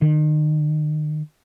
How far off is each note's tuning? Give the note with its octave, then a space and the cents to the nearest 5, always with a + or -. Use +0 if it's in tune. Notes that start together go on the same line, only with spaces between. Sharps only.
D#3 -35